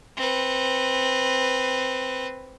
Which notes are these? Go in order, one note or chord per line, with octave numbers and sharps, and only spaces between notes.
C4 B4